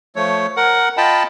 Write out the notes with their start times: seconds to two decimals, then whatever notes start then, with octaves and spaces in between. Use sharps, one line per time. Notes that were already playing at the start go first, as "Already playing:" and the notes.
0.16 F3 A3 C#5
0.57 A#4 F#5
0.97 F4 D#5 G5 A5 B5